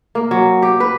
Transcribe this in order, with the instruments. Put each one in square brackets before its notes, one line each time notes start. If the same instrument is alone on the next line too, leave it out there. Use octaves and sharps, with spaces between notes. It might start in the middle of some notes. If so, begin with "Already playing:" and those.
[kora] A#3
F#3
G4
B4